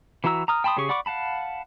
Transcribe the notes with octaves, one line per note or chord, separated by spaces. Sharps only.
E3 E4 F#4 A#5 E6
A#5 D#6 F6
G5 A5 B5 C6 D#6
C#3 C#4 G4 G#4 C#6
D5 F#5 B5 C#6 D6
F5 F#5 A5 B5